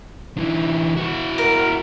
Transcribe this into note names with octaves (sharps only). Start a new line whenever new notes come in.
D3 E3
E4 F#4
A#4